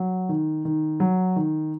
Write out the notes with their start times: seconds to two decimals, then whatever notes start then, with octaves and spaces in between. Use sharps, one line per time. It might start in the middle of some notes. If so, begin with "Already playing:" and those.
Already playing: F#3
0.29 D#3
0.65 D#3
1.00 F#3
1.36 D#3